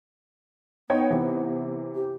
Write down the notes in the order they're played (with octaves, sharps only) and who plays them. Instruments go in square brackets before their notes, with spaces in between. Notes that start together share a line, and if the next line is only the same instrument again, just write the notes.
[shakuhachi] B3 [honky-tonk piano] D#4 C#5 G5
[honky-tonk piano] C3 E3
[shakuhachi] G4